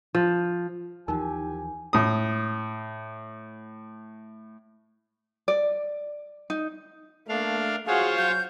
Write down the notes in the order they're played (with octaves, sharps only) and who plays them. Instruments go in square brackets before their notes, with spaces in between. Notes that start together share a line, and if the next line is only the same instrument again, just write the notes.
[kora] F3
[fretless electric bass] D#2 E3 F3 [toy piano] D#4 A#4 [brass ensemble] G4 G#5
[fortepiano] A2 D#6
[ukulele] D5
D#4
[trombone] A3 [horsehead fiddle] A#3 [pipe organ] D4 F5
[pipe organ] F4 C5 C#5 [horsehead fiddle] F#4 F5 [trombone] G#4 [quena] F#5
[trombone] F#3 [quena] G6